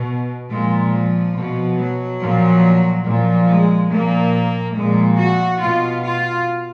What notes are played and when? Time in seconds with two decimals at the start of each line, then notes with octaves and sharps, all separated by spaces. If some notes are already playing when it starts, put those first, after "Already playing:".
Already playing: B2
0.50 A#2 F3 G#3
0.93 F3
1.36 B2
1.78 F#3
2.21 A#2 F3
3.06 A#2 F3
3.48 G#3
3.91 A#2 F3 A#3
4.76 A#2 F3 G#3
5.18 F#4
5.60 B2 F4
6.03 F4